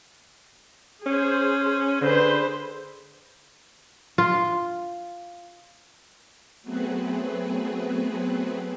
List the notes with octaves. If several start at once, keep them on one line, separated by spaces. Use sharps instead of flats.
C#4 G#4 C5
D3 G#4 B4 C5
F4
F#3 A3 B3 C4 G#4 B4